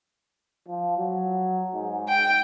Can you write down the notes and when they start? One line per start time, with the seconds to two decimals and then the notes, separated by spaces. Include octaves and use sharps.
0.68 F3
0.98 F#3
1.73 G#2
2.09 G5